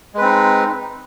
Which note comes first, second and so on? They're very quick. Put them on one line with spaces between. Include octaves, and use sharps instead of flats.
G#3 B4 C4 D#4